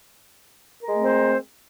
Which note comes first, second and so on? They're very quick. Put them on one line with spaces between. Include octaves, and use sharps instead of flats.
A#4 G#3 A3 C4 C5